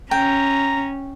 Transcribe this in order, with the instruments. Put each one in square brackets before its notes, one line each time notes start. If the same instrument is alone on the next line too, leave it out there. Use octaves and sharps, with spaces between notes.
[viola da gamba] C#4 [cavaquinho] G5 [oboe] A#5